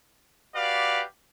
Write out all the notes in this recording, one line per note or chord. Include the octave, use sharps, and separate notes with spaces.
F#4 G4 B4 D5 F5